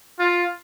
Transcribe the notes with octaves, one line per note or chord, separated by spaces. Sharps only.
F4